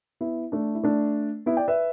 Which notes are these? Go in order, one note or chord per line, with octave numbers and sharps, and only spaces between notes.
B3 E4
A3 D4
E4
A3 D4
B3 E4
D5 G5
B4 E5